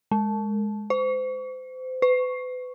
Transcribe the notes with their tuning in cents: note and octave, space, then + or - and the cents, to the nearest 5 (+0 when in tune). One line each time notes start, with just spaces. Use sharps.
G#3 +5
C5 -30
B4 +35